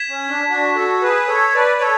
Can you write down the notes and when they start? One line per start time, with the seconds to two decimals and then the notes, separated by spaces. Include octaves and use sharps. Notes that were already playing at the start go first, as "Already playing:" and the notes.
Already playing: G#6 B6 E7
0.09 C#4
0.29 D4
0.49 D4 F#4
0.75 F#4 A4
1.02 G#4 B4
1.28 A4 C#5
1.55 B4 D5
1.81 A4 C#5